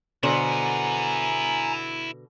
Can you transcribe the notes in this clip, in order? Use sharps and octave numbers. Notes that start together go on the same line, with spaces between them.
B2 D3 E4 C5 F#5 G#5 A#5